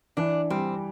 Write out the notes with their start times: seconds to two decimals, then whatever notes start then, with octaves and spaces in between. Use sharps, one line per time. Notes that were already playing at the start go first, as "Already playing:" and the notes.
0.17 E3 D4
0.50 G3 C4